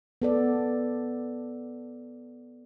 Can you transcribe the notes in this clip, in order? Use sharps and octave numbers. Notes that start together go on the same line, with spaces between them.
B3 A4 D5